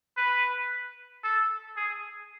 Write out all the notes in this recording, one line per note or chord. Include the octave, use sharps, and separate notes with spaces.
B4
A4
G#4